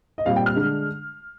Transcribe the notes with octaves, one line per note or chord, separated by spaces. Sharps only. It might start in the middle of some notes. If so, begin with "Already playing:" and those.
D#5
A#2 G3 C4 F5
G5
F6
D3 G#3 D4